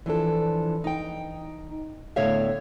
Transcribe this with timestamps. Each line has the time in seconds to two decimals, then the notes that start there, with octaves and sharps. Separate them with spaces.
0.06 E3 F3 D4 A4
0.84 D#4 G5
2.16 A2 D3 B3 C#5 E5 F5